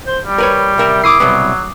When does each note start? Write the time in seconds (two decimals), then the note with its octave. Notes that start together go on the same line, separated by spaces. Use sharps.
0.07 C5
0.25 G3
0.38 A#4 B4 C#5
0.78 C3 A#4 E5
1.03 E4 D6 D#6 C7
1.20 C2 B2 F#3 B3